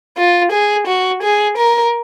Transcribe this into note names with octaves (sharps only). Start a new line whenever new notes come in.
F4
G#4
F#4
G#4
A#4